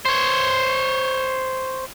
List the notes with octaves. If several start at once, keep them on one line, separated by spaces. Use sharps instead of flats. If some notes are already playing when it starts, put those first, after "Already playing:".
C5 C#5